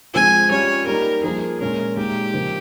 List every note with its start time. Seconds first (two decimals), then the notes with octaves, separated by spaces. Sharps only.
0.14 F3 G#3 C4 F4 G#5
0.50 G3 C#4 F4 C#5
0.86 G3 A#3 D#4 A#4
1.24 F3 A#3 F4 G#4
1.60 A#2 G#3 C#4 A#4
1.97 A#2 G#3 D#4 G4
2.33 C#3 F3 A#3